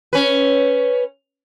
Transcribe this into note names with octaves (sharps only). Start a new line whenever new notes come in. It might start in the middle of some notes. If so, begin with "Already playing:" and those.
C#4 B4